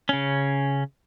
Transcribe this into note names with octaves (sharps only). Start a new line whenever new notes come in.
C#3 C#4